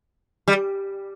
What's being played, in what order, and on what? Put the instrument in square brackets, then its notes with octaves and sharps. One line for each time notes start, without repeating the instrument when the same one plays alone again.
[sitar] G3